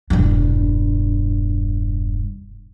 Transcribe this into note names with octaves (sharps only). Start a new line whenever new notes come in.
E1 G2